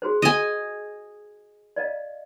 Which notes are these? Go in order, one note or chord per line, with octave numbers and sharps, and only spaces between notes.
F#4 G#4 C5
D#5 G#5
D5 D#5 F5